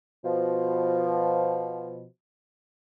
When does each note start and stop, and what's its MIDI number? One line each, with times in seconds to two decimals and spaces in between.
0.25 2.05 47
0.25 2.05 53